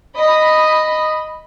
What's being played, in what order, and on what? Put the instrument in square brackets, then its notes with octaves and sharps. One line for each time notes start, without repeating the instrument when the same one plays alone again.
[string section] D#5 B5